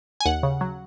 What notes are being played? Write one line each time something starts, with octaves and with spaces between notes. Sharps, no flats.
G#5
D#2 F#5
C#3
F#3